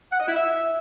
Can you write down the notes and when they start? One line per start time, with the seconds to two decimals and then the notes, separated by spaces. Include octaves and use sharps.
0.12 F#5
0.20 D#5
0.28 E4
0.36 E5